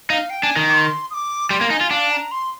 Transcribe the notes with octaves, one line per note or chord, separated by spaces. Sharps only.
D#4 F5
G5
D4 G#5
D#3
D6
C6
D#6
D6
G3 C6
A#3
D#4 G#5
F4
D4 F5
A#5
C6